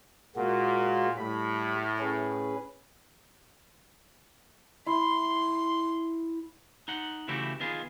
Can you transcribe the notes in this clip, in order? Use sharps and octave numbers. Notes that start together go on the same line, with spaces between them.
A#2 G#3 A#3 F#4
A2 G3 B5
C#4 G#4 B4
E4 C6
D#4 F#5
C#3 E3 A3 E4 F#4 G4
D#3 B3 F4 G#4